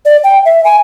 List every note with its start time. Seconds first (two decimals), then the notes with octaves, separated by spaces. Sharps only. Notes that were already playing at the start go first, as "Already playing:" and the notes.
0.05 D5
0.24 G5
0.45 E5
0.64 G#5